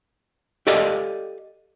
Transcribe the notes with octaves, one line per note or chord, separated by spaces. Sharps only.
G4 A4 D5 D#5 F5